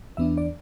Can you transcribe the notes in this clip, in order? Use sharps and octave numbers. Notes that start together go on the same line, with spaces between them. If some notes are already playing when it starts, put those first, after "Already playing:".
E2 E3 B3 D4 E5
D5